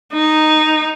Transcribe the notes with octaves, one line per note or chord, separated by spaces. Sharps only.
D#4